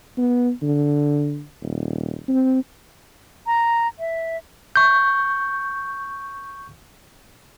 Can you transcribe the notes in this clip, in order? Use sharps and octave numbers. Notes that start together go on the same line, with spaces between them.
B3
D3
D#1
C4
A#5
E5
C#6 G6